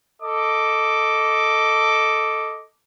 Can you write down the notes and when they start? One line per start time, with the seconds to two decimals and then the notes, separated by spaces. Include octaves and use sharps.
0.22 A4 D#5 D6